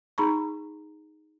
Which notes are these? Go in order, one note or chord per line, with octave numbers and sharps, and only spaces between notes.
D#4 G#4 A#5 B5 C#6